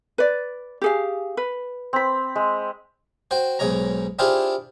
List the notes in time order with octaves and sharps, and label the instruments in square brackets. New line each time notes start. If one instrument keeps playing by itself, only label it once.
[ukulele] B4 D5
G4 G#4 F5
B4
[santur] C4 B5
G#3
[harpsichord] F#4 C5 G5
B1 G#2 G#3 C#5 A#5
D4 E4 F4 G4 G#4 C5